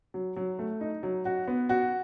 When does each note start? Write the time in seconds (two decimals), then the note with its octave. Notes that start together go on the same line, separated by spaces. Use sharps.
0.14 F#3
0.36 F#3
0.59 A3
0.81 D#4
1.03 F#3
1.25 F#4
1.47 B3
1.69 F#4